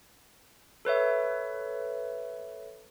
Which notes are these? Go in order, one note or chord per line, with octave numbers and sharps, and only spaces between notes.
A4 B4 C#5 E5